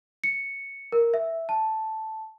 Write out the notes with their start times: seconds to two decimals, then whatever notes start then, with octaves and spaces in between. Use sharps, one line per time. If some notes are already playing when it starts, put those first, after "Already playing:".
0.24 C#7
0.92 A#4
1.14 E5
1.49 A5